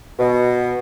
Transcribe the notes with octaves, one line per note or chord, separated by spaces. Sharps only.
B2